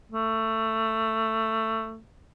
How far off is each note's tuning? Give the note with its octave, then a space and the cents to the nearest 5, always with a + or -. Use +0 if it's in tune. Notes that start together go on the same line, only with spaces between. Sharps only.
A3 +15